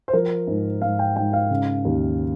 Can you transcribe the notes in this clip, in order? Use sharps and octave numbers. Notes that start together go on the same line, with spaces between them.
C5
F3 A#4
G#2
G#2 F5
G5
G#2 G5
F5
C#3
D#2